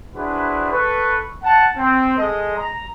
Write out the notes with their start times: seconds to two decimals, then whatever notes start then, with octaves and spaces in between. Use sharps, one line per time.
0.15 D4 E4 F#4 G#4 B4 C5
0.71 A4 B4 C#6
1.43 F#5 A5
1.77 C4
2.17 G#3 A4 D#5
2.57 A#5